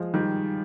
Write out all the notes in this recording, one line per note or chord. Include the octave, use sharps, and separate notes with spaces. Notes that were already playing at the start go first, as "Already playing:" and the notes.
Already playing: F3 G#3
D#3 G3